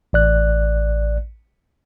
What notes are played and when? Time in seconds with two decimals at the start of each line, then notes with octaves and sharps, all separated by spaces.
0.13 A1 D5 F#6